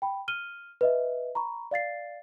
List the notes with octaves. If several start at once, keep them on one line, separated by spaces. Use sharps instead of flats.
G5 B5
F6 D#7 G7
B4 D#5 E5
A#5 B5 C#6
D5 F5 A6 C7